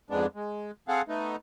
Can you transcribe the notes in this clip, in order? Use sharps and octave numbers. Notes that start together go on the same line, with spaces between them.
F2 G#2 G#3 B3 D4
G#3
C4 G#4 A4 F5 F#5
A3 B3 D#4